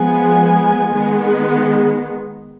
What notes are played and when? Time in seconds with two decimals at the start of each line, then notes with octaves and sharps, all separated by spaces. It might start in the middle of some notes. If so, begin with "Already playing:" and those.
Already playing: F3 G#3 B3 G#5
0.94 D#3 G#3 B3